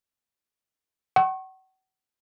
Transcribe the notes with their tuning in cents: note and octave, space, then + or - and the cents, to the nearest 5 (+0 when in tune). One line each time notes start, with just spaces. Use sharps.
F#5 +40 C#6 -30